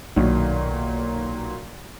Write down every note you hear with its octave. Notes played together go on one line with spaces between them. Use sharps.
B1 A#2 D#3 F#3